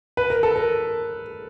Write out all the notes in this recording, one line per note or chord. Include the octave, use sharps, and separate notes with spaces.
B4
A#4
A4
A#4